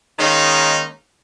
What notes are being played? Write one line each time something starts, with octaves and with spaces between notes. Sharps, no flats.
D#3 G#3 A#3 C#4 D#4